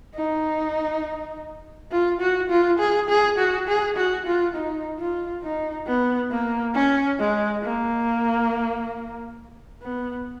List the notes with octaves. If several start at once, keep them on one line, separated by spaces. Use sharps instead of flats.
D#4
F4
F#4
F4
G#4
G#4
F#4
G#4
F#4
F4
D#4
F4
D#4
B3
A#3
C#4
G#3
A#3
B3